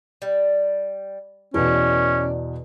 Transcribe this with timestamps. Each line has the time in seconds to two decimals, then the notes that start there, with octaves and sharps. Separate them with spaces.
0.22 G3
1.54 E2 B2 C#4 D4